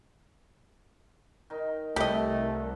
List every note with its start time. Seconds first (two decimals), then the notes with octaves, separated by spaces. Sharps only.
1.50 D#3 D#4
1.96 C2 A3 G4 B4 D#5